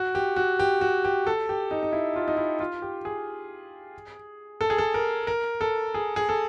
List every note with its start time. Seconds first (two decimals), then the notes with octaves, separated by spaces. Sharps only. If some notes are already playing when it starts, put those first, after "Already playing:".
Already playing: F#4
0.15 G4
0.36 F#4
0.59 G4
0.81 F#4
1.05 G4
1.27 A4
1.49 G4
1.71 D#4
1.83 D#4
1.93 E4
2.16 F4
2.28 D#4
2.37 E4
2.60 F4
2.82 G4
3.05 G#4
4.61 A4
4.70 G#4
4.78 A4
4.94 A#4
5.27 A#4
5.61 A4
5.94 G#4
6.16 G#4
6.29 A4